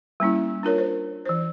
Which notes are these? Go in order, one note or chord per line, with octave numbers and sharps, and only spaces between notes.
G3 A#3 C#4 E4
D4 F4 A#4 C#5
C5
E3 C5